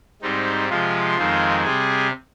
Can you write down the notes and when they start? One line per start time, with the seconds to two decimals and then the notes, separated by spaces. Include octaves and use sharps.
0.22 G#2 G3 C4 D#4
0.70 C3 F3 G#3 F4
1.17 F2 D#3 G#3 C4
1.65 C3 G3 C4 G#4